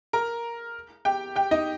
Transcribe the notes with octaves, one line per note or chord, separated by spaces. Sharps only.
A#4 A#5
G4 G5
G4 G5
D#4 D#5